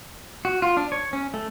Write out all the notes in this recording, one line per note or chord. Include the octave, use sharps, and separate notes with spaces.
F#4
F4
D4
C#5
C#4
A3